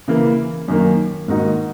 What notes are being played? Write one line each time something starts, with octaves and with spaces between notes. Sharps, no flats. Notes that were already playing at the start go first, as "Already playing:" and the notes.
C#3 E3 A#3
F#2 D#3 A#3
G#2 D#3 A#3 D#4 F#4